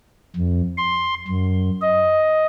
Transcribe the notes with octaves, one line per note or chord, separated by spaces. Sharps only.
F2
C6
F#2
D#5